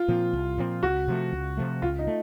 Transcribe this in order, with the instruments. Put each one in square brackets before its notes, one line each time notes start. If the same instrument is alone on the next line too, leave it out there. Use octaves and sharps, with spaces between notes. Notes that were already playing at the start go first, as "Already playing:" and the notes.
Already playing: [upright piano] F4
[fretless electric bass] A#2 F3 C4
C2
A#2 F3 C4
[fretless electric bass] C#2 [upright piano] F#4
[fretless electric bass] C3 F3 A3
C#2
C3 F3 A3
[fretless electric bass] C#2 [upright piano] F4
[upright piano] D#4
[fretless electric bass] A3